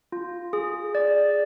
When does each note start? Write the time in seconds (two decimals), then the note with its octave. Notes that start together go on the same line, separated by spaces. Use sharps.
0.12 F4
0.53 G#4
0.95 D5